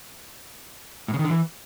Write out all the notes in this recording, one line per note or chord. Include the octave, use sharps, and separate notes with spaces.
A2
C#3
D#3
D3
E3